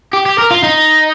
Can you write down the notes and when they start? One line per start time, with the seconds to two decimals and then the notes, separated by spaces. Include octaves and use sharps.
0.13 G4
0.26 G4
0.38 A#4
0.51 F4
0.63 D#4